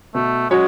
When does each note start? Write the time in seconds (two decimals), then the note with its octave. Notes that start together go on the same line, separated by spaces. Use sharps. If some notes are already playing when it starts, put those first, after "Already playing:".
0.15 B2 A3
0.50 F#3 G#3 C#4 F#4 C#5